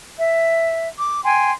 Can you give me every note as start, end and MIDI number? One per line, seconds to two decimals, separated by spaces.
0.19 0.87 76
0.98 1.23 86
1.24 1.52 79
1.24 1.52 80
1.24 1.52 84